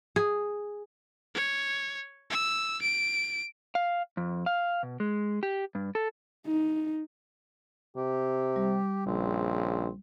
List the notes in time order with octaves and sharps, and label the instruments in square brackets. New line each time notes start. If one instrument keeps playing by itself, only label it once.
[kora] G#4
[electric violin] C#5
E6
D7
[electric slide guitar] F5
F2
F5
B2
G#3
G4
G2
A4
[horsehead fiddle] D#4
[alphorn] C3 [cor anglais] G4
[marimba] G3
[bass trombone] A#1 [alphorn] C#3 [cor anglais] C4